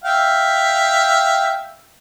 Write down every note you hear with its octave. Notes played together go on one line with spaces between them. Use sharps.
E5 F5 G5